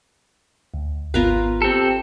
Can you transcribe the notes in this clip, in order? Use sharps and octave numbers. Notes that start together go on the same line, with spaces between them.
D2
G#1 B3 F4 A#4 B4
C4 G4 A4